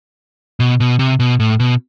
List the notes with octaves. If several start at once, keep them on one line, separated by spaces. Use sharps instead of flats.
B2
B2
C3
B2
A2
B2